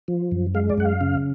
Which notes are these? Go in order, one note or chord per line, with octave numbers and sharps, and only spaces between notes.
F3
F#2
G#3 F5
D5
F#2 F#5
F5
C#3